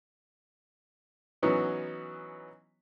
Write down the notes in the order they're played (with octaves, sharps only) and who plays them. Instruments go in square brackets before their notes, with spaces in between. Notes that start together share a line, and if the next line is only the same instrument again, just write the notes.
[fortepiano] E3 F#3 B3 C#4 D#4